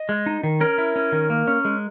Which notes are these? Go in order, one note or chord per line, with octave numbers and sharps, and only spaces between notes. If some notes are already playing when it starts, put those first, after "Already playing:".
Already playing: D#5
G#3
D#4
D#3
C#4 A#4
E4
C#4
D#3
A#3
C#4
G#3